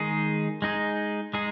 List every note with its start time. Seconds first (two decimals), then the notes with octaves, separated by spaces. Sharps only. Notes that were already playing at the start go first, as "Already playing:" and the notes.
Already playing: D#3 G#3 D#4 G#4
0.62 G#3 D#4 G#4
1.34 G#3 D#4 G#4